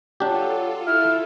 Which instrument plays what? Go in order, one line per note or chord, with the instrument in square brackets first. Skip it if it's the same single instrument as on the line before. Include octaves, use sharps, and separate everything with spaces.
[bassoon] F#3 [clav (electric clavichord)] D4 G4 [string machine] F4 A4
[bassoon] E4 [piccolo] F6